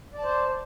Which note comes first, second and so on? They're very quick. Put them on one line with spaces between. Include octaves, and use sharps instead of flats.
D5 A5 C5